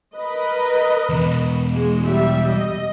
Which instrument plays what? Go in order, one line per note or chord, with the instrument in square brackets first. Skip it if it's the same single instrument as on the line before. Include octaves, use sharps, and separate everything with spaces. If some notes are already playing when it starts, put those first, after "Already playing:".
[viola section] A#4 B4 D#5
[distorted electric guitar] E2 B2
[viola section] G#3
G3 E5
D#5